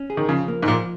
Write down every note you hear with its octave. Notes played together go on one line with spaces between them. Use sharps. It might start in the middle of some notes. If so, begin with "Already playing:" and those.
Already playing: C#4
G#4
D#3
C#3 F3
A#3
G#2
A#2 F3